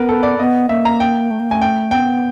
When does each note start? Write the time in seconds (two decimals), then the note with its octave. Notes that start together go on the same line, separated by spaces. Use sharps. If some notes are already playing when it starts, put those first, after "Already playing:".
Already playing: B3 A#4 B4
0.09 A4
0.23 D5
0.39 B3 D#5
0.69 A#3 E5
0.85 A#5
1.00 G5
1.31 A3
1.40 A#3
1.50 A3 G#5
1.61 G5
1.91 B3 G5